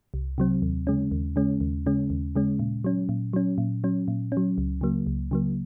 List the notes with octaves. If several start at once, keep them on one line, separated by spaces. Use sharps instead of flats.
C2
C3 F#3 C4
D#2
C#3 G#3 C#4
D#2
C#3 G#3 C#4
D#2
C#3 G#3 C#4
D#2
C#3 G#3 C#4
A#2
F#3 C#4
A#2
F#3 C#4
A#2
F#3 C#4
A#2
F#3 C#4
C#2
C#3 F#3 A#3
C#2
C#3 F#3 A#3